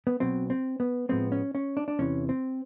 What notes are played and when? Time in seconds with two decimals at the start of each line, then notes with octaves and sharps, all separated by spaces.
0.07 B3
0.20 B1 B2 F#3 C4
0.50 C4
0.80 B3
1.09 A2 F3 G#3 B3 C4
1.32 C#4
1.55 C#4
1.77 D4
1.88 D4
1.99 E2 C3 E3 C#4
2.29 C4